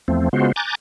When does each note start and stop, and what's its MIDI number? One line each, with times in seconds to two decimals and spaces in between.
0.08 0.29 40
0.08 0.29 53
0.08 0.29 57
0.08 0.29 60
0.33 0.52 49
0.33 0.52 56
0.33 0.52 59
0.33 0.52 65
0.33 0.52 66
0.33 0.52 72
0.56 0.75 80
0.56 0.75 82
0.56 0.75 86
0.56 0.75 90
0.56 0.75 91
0.56 0.75 93